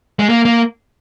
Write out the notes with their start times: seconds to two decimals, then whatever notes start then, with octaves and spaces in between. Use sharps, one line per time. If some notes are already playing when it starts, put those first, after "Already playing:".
0.19 G#3
0.29 A#3
0.45 A#3